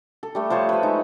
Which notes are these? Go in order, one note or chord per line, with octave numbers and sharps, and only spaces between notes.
A4
G3 A3
F3 C5 C#5 A5
B4 E5
G#3 D#4